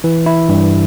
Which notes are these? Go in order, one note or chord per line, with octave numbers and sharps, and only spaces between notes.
E3
E4
G2